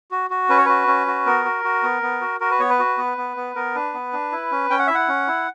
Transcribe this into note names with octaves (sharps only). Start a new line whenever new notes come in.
F#4
F#4
C#4 B4
C#5
F#4 B4
C#4
F#4
B3 A#4
F#4
F#4
B3
B3
F#4
F#4 A#4
B4
B3 C#5
B4
F#4
B3
B3
B3
B3 A#4
D4 B4
B3
D4
E4
C#4
C#4 G5
F#5
E4 E5
F#5
C#4
E4